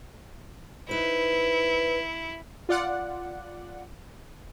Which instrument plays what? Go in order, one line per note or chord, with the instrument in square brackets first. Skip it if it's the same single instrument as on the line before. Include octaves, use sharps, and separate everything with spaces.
[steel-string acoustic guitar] D#4 B4 C5 [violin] E4
[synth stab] F4 D5 F#5